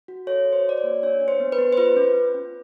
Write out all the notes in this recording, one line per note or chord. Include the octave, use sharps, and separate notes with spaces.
F#4
A4 C#5
F#4
C5
F#4 D5
C#5
A#3
D4 C#5
D4
C5
B3
B4
B3
C5
F4 B4
C#4
F4
C#4